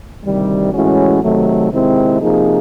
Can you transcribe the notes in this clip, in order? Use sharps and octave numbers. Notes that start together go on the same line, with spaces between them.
D2 C3 D#3 G3
A2 E3 G#3 C#4 F#4
C3 D#3 F#3 A3
C3 D#3 G#3 C4 E4
C3 F3 A#3 D#4 G#4